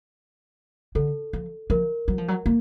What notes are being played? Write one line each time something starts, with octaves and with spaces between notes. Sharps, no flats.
D3 A4
F3
F3 A#4
F#3
F3
F#3
A#3